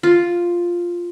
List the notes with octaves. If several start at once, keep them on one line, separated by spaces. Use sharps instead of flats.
F4